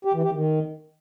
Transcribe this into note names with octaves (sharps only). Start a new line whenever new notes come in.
G4
E3
G4
D#3